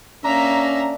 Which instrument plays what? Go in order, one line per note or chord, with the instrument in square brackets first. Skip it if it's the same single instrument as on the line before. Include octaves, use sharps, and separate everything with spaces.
[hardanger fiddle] A#3 E5 [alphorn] C#4 [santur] D4 [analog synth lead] A#5